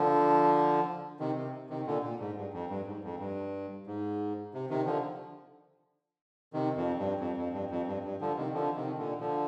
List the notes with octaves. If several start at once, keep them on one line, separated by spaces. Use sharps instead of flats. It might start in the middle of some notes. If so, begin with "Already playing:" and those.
Already playing: D3 F3
C3 D#3
C3
C3 D#3
A#2 D3
A#2
G#2
G2
F2
G2
G#2
F2
G2
G#2
C3
C3 D#3
D3 F3
C3 D#3
F2
G2
F2
F2
G2
F2
G2
G2
D3 F3
C3 D#3
D3 F3
C3 D#3
A#2 D3
D3 F3